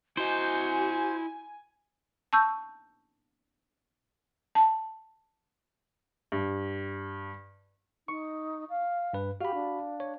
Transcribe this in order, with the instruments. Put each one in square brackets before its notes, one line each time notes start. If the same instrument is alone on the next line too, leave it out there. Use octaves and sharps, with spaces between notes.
[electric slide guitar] E4 D#5 [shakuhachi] F#4 [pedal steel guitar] C5 [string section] G#5
[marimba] A5 C#6 E6 G6
[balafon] A5
[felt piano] G2
[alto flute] D#4 [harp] C#6
[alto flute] F5
[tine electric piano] G2 B4
[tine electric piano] F#4 B5 [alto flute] G4 [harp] F5
[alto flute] D4
[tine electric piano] C#5